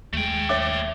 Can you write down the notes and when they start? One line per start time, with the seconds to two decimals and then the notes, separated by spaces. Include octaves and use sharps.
0.13 D#2 G#3 A3 G5
0.49 C#5 E5 D6